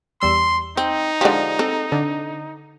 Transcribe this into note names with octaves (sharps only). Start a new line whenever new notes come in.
E2 G3 C6 E6
C4 D#4
D3 F3 G#3 D4 G4
C4 A4 A#5
D3